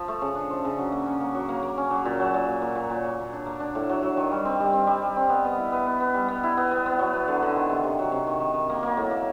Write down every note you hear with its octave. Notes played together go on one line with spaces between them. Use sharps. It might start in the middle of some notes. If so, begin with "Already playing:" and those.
Already playing: F3
A3
C#3
D4
F3
C#3
F#3
A#3
C#4
A#3
F#3
A#3
A#3
C#4
F#3
A#2
F#3
A#2
A#3
A#2
A#2
A#2
A#3
A#3
D4
A#3
D4
A2
F#3
F#3
D#3
G3
C4
G3
C4
G3
G3
C4
B3
B3
E4
B3
B3
B3
G3
B3
E4
B3
B3
B3
F#3
B3
D3
D3
D#3
C3
C3
F#3
C3
D#3
D#3
D#3
A#3
A#3
A2
A#3